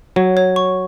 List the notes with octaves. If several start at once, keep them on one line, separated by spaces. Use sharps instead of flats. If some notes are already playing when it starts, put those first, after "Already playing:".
F#3 C#5
C#5
C#6